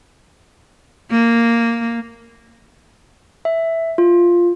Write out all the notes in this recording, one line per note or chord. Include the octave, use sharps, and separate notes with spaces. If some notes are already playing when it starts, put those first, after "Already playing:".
A#3
E5
F4